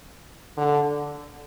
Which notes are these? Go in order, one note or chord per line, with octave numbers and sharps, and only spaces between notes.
D3